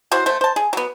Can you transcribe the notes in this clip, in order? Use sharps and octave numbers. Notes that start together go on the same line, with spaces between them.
F#3 E4 F#4 C5
A3 C5
C5 A5
G#4
F#3 B3